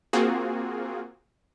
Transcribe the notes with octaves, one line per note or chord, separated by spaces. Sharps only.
A#3 C4 F4 F#4 G#4